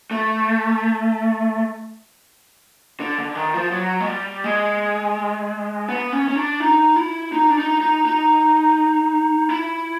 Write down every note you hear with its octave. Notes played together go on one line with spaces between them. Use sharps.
A3
D3
D3
D#3
F3
F#3
G#3
G3
G#3
B3
C#4
C#4
D4
D#4
E4
D#4
D4
D#4
D#4
D#4
E4